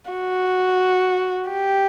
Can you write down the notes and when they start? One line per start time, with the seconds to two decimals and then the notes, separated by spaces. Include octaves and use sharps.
0.10 F#4
1.49 G4